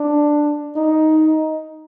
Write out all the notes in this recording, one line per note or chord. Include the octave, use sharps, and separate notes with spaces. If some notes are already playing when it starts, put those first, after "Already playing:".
Already playing: D4
D#4